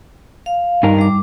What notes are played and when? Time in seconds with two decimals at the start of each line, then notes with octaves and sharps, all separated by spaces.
0.46 F5
0.83 G2 G3 D#4 A#4
0.99 G3 D6